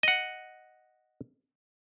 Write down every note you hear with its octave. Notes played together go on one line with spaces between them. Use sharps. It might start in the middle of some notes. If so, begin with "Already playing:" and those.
D#5 F#5